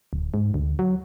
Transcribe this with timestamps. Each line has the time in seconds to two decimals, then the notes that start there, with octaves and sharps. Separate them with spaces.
0.13 D1
0.34 G#2
0.54 D2
0.79 F#3